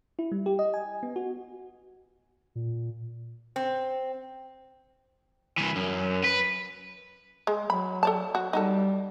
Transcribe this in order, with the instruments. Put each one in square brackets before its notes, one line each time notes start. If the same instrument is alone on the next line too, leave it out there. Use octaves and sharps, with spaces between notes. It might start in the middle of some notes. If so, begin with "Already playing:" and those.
[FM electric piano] E4
G3
G4
D#5
G#5
B3
F#4
[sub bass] A#2
[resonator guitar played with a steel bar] C4
[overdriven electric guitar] C2 E3
F#2
B4
[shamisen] G#3
[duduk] F#3 [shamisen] B5
[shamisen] A4 D5 A5
F#4
[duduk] G3 [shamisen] D#4 F#4 A4